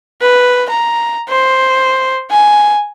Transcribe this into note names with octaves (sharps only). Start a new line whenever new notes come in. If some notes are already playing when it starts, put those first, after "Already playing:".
B4
A#5
C5
G#5